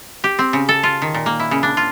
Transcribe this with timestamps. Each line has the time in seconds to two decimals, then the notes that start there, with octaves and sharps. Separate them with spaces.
0.24 G4
0.39 C4
0.53 C#3
0.69 A4
0.83 F4
1.02 D#3
1.14 A#2
1.26 A#3
1.40 E4
1.51 C#3
1.63 D4
1.77 F4